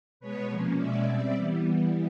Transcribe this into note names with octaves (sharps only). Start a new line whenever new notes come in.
B2 G#3 B3 B4 C#5
C3 F3 A#3 C#4
B2 G#3 C#4 D5 E5
B2 G3 C4
E3 G3 B3